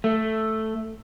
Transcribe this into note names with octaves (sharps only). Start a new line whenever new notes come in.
A3